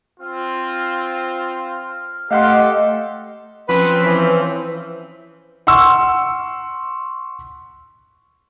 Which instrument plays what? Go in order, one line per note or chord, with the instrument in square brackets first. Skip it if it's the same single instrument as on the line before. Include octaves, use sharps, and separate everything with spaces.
[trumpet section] C4 F4 [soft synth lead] F6
[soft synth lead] A3 [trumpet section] G4 A4 [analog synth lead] D#5 [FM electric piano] F5 F#5 C6
[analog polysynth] F3 C4 C#4 [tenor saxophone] B4
[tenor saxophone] E3
[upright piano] F#5 C6 C#6 E6